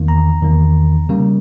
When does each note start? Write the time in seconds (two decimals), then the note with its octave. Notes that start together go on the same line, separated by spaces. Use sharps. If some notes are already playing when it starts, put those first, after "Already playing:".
Already playing: E2 D#3 A#3
0.08 A#5
0.42 E2 D#3 A#3
1.09 C#3 G3 A#3